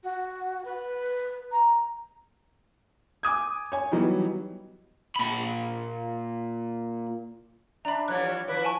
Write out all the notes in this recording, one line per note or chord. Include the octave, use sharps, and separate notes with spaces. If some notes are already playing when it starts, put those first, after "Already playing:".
F#4
B4
A#5
G#5 D6 D#6 G#6
C#5 G#5
E3 F#3 G3 B3 D#4
A#2 B5
D4 E5 A#5 B5
E3 F3 G3 C#5 F#6
F3 E4 B4
G#5 A5 C#6